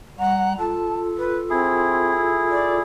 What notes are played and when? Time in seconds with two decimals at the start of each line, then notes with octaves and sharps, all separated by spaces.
0.19 G3 F#5 A#5
0.59 F4 A4 A5
1.18 B4
1.50 C4 E4 G#4
2.50 D5